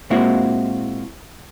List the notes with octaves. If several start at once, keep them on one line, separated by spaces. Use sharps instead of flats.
A#2 G#3 A#3 C4 E4 F#4